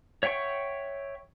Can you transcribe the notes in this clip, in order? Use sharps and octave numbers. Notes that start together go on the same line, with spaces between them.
C#5 E5 F#5 G5 C#6